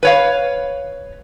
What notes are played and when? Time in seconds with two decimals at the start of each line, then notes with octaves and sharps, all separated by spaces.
0.03 B4 C#5 F5